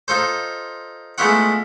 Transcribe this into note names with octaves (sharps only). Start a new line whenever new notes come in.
D#4 F4 A4 C5
G#3 A3 B3 E4 F4 F#5